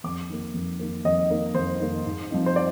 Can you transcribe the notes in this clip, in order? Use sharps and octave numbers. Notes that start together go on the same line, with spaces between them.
F2 D6
D#3 A#3
F2
D#3 A#3
F2 D#5
D#3 A#3
F2 C5
D#3 A#3
G#2
F3 C4 D#4
C5
D5